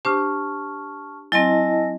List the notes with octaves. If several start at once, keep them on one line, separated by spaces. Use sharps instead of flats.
D4 G4 C5 A5 C#6 F6
F#3 C4 E4 D#5 G#5 A5 A#6